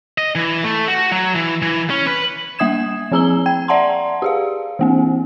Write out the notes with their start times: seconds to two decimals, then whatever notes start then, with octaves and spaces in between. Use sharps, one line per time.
0.18 D#5
0.35 E3
0.64 A3
0.88 F#4
1.12 F#3
1.35 E3
1.62 E3
1.90 C#4
2.07 B4
2.59 G3 A#3 E5 D#6 G#6 E7
3.12 F3 C4 G#4 A#5 E6 G7
3.46 G5 G#6
3.68 D5 E5 F#5 A5 A#5 C6
4.22 G4 G#4 F5
4.79 E3 A#3 C4